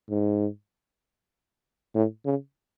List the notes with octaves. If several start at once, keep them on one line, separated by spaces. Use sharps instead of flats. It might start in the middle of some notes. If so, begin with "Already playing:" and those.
G#2
A2
C#3